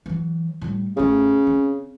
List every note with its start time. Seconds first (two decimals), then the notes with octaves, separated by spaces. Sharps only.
0.06 E3 F#3
0.61 A2 G3
0.97 A1 C#3 A3
1.47 C4